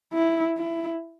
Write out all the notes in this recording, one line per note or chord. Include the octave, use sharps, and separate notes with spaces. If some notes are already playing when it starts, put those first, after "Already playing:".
E4
E4